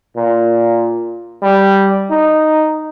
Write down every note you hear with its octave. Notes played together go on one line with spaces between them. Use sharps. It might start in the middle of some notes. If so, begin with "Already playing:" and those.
A#2
G3
D#4